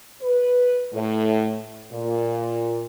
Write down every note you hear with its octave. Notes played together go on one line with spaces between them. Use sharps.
B4
A2
A#2